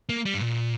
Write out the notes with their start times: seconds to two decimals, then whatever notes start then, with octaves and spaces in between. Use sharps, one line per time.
0.09 A#3
0.25 G3
0.34 G2
0.41 A#2